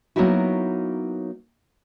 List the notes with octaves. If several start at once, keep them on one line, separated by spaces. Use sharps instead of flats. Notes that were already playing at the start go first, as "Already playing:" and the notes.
F#3 A#3 B3 D#4 E4 F#4